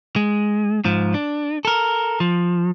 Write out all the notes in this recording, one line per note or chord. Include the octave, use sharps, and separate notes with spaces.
G#3
G#2 F3
D4
A4 A#4
F3